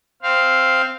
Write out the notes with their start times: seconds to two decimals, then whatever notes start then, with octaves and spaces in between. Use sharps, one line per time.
0.22 C4 F5